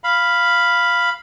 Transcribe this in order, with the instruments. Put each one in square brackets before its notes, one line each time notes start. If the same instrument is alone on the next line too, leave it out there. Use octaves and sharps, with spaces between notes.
[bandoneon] F5 B5